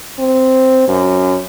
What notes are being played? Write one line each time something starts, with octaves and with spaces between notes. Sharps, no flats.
C4
F#2